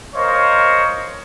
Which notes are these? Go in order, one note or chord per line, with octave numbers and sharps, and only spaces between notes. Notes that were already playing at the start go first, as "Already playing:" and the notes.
A#4 C5 C#5 D#5 F5